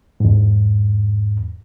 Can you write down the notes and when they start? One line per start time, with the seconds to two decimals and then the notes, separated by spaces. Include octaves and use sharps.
0.20 E2 G#2